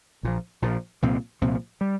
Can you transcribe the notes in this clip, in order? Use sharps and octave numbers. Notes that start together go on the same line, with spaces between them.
A#1 A#2 F3
A#1 A#2 F3
C2 A#2 F3 C4
C2 A#2 F3 C4
G3